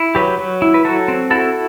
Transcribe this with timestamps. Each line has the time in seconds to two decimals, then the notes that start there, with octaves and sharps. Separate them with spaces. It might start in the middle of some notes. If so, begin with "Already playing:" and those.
Already playing: E4
0.15 F#3 G4 B4
0.39 F#3
0.62 E4
0.74 B4
0.84 F#3 F#4 A4
1.08 C4
1.30 E4 F#4 A4